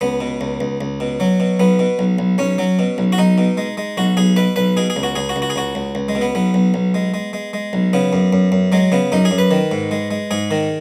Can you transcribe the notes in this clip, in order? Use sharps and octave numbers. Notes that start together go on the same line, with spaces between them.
C#2 B3
B2
C#2
C#2
C#2
B2
F#3
B2
B1 B3
B2
B1
B1
B1 C#4
F#3
B2
B1
F#4
B1 D#4
B2
G#3
G#3
B1 F#4
B1 G#4
B2 B4
B1 B4
B2 G#4
G#4
C#2
F#4
C#2 G#4
F#4
C#2
F#4
G#4
C#2 F#4
C#2
C#2
G#3
B2
B3
B1 B3
B1
B1
G#3
G#3
G#3
G#3
B1
C#3 B3
F#2
F#2
F#2
F#3 G#3
C#3 B3
F#2 D#4
G#4
F#2
B4
D#3
G#2
G#3
G#3
G#2 G#4
D#3